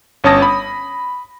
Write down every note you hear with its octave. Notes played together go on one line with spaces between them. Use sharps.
G1 C#4 C#5 A5 D#6 A#6
B5 D#6